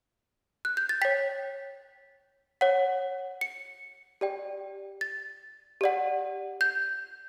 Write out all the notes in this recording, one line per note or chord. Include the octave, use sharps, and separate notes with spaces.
F#6
G6
A6
C#5 G5 B6
C#5 F#5
C#7
G4 D5 G5
A6
G4 D5 F#5
G6